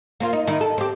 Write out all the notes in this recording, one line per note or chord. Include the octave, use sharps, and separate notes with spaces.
A#3 C4 F4
D#4
D#3 D#4 E4
A4
C4 G4